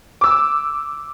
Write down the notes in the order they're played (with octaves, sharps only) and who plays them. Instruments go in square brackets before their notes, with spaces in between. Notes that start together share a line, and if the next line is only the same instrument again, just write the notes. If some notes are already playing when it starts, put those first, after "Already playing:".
[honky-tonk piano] D6 E6